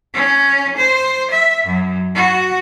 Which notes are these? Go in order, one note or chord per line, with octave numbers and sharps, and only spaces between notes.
C#4
C5
E5
F#2
F#4